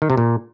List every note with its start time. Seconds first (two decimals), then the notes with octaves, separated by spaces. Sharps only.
0.02 D#3
0.10 C3
0.17 A#2